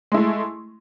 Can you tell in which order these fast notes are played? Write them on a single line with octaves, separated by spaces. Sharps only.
G#3 E4 A3